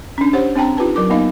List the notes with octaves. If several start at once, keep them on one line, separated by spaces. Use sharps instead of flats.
C#4 D4
G4 C5 C#5 F#5
C4 D4 G5 A5 A#5
D#4 F4 G4 B4 A5
F#3 A#4 D6
A#3 B3 D#4 D#5 F5